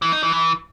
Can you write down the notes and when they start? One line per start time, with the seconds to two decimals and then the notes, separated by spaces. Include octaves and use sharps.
0.02 E3
0.12 D#4
0.23 E3
0.33 E3